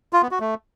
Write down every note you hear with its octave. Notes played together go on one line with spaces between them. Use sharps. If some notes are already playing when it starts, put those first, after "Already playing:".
F4
B3
F#4
A3